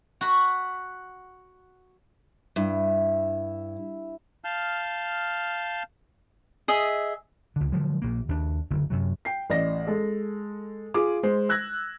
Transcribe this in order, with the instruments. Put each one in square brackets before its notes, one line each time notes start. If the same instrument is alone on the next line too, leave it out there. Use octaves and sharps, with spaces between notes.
[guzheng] F#4 B5
[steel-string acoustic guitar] G2 [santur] E4
[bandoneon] F5 A5 F6 G6
[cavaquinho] G#4 D#5 E5
[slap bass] C#2 D3
D3 F3 F#3 G#3
A#1 A#3
D#2 D4
F#1 D2 D3
F#2 C3 F#3
[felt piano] G5 C7
A1 D5 D#5 A#6
G#3 A4
F4 G#4 D6
G#3 C5
E6 F#6 G#6 A#6